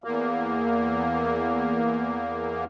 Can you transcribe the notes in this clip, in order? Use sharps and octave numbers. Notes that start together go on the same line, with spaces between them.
E2 A#3